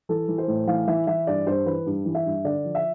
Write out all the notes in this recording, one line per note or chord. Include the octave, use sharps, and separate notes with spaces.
E3 A4
E3
C5
A2
E3 F5
E3 E5
E3 E5
G2 D5
G2 C5
E3 B4
G2
E3
E5
G2
D3 D5
F3
E5